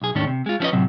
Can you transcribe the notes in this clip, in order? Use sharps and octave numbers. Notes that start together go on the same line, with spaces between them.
B1 G#4
D#2 G#2 D#3 A3 C#4 D4
C3
G#3 F4
F3 B3 C#4 B4 D#5
A2 C3 F#3